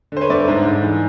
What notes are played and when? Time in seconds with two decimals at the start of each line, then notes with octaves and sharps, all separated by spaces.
0.12 D3 C5
0.21 B4 C#5
0.30 G2 D5 E5
0.48 G#2
0.65 G#2
0.82 E3